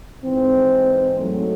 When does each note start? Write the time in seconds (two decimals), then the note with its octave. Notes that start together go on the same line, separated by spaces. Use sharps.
0.24 G#2 E3 C4
1.19 G#2 F#3 A3